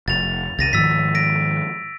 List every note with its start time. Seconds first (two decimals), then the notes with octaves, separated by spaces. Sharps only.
0.08 F1 A6 F7
0.59 C2 A6 A#6 D#7
0.73 G#2 D#3 F3 E6 A6 B6
1.15 A#6 D7